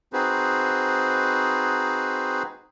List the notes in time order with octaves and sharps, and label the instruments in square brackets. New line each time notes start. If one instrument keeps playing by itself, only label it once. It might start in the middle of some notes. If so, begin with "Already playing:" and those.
[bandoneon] C4 D#4 F#4 G#4 B4 C5